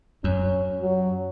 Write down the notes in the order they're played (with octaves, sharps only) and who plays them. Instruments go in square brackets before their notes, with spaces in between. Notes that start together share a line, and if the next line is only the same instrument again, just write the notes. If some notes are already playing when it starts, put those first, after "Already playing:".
[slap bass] F#2 [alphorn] C#4
[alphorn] F#3